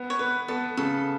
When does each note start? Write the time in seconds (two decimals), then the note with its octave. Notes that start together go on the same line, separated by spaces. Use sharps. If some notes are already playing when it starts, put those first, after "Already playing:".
Already playing: B3
0.10 C#5
0.19 B3 B4
0.48 B3 A4
0.77 C#3 A4